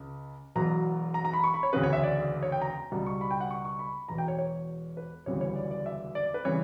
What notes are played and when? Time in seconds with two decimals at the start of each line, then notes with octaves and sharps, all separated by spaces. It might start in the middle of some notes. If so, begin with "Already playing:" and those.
Already playing: C#2 C#3
0.55 E1 E2 B2 F#3 A#5
1.14 A#5
1.25 A#5
1.33 B5
1.44 C#6
1.54 B5
1.63 C#5
1.73 E1 D2 C#3 B4
1.83 C#5
1.93 E5
2.03 D5
2.43 C#5
2.52 G5
2.62 A#5
2.92 C#2 B2 G3
3.06 C#6
3.21 B5
3.31 G5
3.41 F#5
3.50 C#6
3.65 C#6
3.79 B5
4.08 E1 E2 B2 A#5
4.18 G5
4.28 C#5
4.39 C#5
4.97 B4
5.26 E1 D2 C#3 E3 G3 C#5
5.41 C#5
5.56 D5
5.71 D5
5.86 E5
6.15 D5
6.34 B4
6.45 C#3 E3 G3 C#5